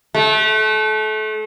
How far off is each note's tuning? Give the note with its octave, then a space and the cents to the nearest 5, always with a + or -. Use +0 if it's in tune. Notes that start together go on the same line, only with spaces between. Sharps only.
A3 -30